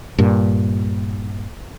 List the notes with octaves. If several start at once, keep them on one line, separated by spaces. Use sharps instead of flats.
G2 A#2